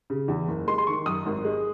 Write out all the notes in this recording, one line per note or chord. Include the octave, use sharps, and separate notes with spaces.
C#3
E2
F#1
G#3 C6
C6
D#3 C#6
F#2 D#6
G#1
G#3